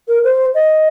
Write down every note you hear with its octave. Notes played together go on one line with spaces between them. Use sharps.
A#4
C5
D#5